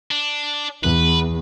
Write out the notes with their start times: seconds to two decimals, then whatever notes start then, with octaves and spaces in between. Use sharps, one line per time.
0.11 D4
0.84 E2 B4